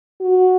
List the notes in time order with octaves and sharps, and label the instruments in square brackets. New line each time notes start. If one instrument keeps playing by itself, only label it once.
[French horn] F#4